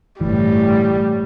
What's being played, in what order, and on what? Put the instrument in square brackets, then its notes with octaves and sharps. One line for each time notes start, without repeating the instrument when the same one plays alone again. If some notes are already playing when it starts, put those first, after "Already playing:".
[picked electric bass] G1 E3 [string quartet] A2 [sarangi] G3